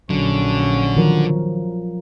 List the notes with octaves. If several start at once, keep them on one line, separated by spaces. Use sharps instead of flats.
A#1 D3 F#3 C#4
D#3 F3 F#3 A#4